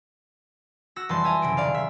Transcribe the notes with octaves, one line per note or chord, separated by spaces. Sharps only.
F#4 E6 A#6
F1 E3 G3 A5 C6
E5 G#5 A#5
F#1 C3 D7
D#1 D5 F5
E5